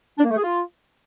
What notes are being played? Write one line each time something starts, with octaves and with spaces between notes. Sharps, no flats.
D4
A#3
A3
G#4
F4